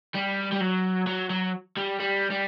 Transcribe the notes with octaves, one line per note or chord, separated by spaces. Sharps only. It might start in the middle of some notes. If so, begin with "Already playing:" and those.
G3
G3
F#3
F#3
F#3
G3
G3
G3